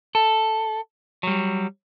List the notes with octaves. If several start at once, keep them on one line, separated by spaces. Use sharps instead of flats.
A4
F#3 G3